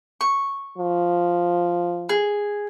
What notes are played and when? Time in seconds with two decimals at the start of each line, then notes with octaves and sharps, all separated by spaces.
0.21 C#6
0.78 F3
2.09 G#4